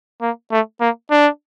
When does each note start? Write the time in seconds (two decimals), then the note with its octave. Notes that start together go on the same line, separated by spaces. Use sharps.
0.22 A#3
0.52 A3
0.81 A#3
1.11 D4